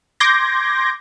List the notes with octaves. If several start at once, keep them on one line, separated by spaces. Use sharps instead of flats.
C6 D6 G6 G#6 A#6